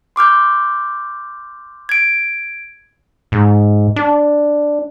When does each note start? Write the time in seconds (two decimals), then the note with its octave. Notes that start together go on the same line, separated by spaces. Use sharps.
0.16 C6 D6 F6 G6
1.89 G#6 D7
3.32 G#2
3.96 D4